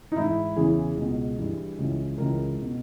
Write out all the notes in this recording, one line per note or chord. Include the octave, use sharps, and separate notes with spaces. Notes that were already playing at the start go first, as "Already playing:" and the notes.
D#4
G#2 E3 E4
E2 C#3 E3 G#4
C#2 B2
G2 E3
C#2 C#3 E3
C#2 C#3 E3 A#4
B2